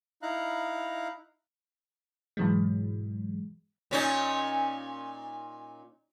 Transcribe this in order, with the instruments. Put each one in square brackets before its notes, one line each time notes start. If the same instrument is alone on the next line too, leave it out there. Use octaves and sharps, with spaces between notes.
[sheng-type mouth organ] D#4 E4 F5 A#5 F#6
[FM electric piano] G#2 B2 E3 F#3 G#3
[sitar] A#2 C#4 D#4